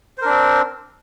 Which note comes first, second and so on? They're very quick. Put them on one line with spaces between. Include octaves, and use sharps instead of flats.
C5 A#4 D4 C4